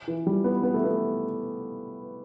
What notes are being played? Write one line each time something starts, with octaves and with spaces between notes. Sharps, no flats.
E3
G3
B3
B3
A3
B3